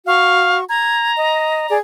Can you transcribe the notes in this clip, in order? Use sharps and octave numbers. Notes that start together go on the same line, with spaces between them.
F#4 F5 C#6
A#5 G#6
D#5
G#4 D5